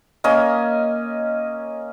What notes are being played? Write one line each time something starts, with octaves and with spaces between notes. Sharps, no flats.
A#3 C#4 D#5 G#5